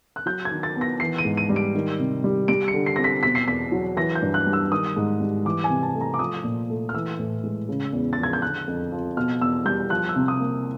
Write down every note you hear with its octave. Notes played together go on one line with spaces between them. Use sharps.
F#6
F#3 G6
G#6
D#3
A6
B3
A#6
E3 C7
D#7
G#2
D#7
G3
D7
D#3
C3
G3
G3 D7
C#7
D3
C7
C4 A#6
B6
B2 B6
C7
E2 B6
F#3
E3 A#6
G6
G2
F#6
G3
E6
D#3 D#6
G#2
G3
E3 D6
G#5
C3
A5
A3
A#5
D6
F3 D#6
A#2
A3
F6
E3 E6
A2
G#3
C#3
E2
F3 A6
G#6
G6
D3 F#6
F2
F3
B2 F6
E2 E6
G3 G6
F3 F#6
E6
C3
D#6
A#3